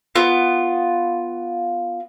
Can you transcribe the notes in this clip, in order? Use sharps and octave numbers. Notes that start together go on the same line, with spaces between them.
B3 F4